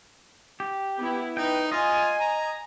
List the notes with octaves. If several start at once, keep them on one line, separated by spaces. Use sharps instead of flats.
G4
B3 E4
D#4 B4 G5
F4 D#5 G#5
A#5